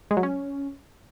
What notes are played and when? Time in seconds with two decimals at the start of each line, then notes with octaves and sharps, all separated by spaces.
0.11 G#3
0.17 F#3
0.23 C#4